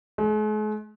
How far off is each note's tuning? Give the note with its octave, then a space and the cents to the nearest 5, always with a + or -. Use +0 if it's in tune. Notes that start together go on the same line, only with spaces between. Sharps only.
G#3 +45